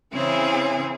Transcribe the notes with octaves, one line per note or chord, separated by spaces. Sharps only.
C#3 E3 C4 C#4 E4 G#4